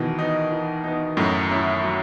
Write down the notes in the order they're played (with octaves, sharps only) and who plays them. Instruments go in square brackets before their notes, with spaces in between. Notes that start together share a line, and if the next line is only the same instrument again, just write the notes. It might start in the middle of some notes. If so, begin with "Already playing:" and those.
Already playing: [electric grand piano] B2 D#3 [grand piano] E3
[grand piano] B3 D#4
E3
B3 D#4
[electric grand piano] F#2 A2 [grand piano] F#3
[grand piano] C#4 E4
F#3